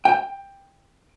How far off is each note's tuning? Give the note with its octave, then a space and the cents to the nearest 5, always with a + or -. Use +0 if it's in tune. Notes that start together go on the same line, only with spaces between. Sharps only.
G5 +15